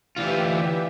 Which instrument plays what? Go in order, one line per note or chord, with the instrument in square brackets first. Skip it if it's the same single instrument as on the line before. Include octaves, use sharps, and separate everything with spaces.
[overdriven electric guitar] D2 F4 [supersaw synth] E3 G4 E5